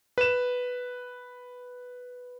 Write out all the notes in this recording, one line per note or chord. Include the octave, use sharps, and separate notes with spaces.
B4 E7